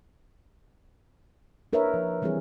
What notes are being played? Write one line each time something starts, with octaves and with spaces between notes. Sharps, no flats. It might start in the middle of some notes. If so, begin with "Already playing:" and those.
D4 A#4 B4 C#5 E5
F3
E3 G3 C4 E4 G#4 C#5